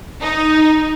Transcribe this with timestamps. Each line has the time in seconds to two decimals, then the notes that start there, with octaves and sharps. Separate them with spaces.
0.21 D#4